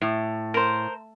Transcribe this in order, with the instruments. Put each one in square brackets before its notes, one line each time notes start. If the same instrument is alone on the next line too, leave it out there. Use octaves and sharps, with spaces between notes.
[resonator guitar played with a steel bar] A2
[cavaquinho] A#4 C5